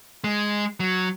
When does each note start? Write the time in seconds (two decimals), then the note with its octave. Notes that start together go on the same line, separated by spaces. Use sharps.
0.24 G#3
0.80 F#3